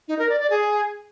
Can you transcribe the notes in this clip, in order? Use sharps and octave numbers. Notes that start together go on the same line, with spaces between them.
D#4
A#4
D5
D5
G#4